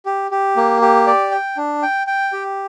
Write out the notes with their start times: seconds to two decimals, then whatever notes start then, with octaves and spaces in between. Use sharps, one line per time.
0.06 G4
0.31 G4
0.57 A#3
0.82 G4
1.07 D5
1.31 G5
1.57 D4
1.83 G5
2.07 G5
2.33 G4